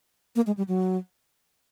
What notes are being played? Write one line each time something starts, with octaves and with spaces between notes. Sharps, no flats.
A#3
G#3
G3
F#3